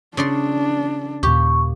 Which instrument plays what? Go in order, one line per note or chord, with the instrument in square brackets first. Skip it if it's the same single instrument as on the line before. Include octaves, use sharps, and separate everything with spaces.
[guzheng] C#3 D5 C6 [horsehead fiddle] D4
[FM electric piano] D#2 A#2 [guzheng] G4 [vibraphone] C#6